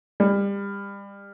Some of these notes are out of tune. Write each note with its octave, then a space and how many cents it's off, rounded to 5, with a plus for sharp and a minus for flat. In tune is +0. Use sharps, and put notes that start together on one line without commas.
G3 +30